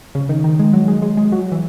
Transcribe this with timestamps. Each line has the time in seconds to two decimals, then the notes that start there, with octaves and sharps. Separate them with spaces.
0.15 C#3
0.29 D#3
0.44 D#3
0.59 G#3
0.73 F#3
0.88 G#3
1.02 G#3
1.17 G#3
1.32 F#3
1.52 E3